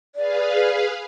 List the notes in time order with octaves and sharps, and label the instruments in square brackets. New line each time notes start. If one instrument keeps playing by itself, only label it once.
[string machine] G#4 B4 F5 [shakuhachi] D5